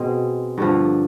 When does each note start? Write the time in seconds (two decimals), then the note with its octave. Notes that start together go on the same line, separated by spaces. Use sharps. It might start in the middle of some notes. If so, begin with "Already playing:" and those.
Already playing: B2 G#3 C4
0.58 G2 D3 F3